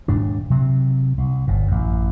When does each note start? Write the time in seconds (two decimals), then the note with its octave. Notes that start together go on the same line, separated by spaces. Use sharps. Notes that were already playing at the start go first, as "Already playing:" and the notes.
0.08 D#1 G#2 D4
0.50 C3 F#3 C4
1.18 C2
1.47 G1 A#2
1.68 A1 F#2